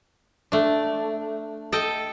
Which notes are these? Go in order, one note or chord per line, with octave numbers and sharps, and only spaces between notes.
A3 D4
A4 D#5 G5